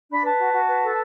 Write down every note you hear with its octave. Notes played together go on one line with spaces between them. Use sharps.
D4 B5
B4 A5
F#4
F#4
B4
A4